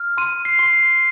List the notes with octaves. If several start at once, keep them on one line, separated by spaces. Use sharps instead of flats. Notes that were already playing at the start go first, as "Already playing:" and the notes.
Already playing: F6
C6 D#7
C7
C6
C7